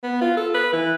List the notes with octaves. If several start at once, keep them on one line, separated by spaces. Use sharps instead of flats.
B3
F4
A4
B4
E3